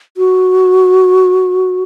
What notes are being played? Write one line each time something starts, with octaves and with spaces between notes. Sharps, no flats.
F#4